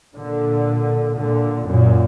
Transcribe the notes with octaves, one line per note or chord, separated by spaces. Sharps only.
A#2 D3
A#2 D3
F#2 A#2